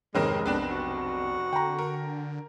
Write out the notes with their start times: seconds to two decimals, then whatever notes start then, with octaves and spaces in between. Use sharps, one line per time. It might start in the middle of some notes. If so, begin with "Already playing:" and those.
0.15 F1 G#2 D#3 G#3 C4 C#4 A#4
0.46 B1 B3 C4 D4
0.71 F#4
1.53 D3 G5 A#5
1.79 A#4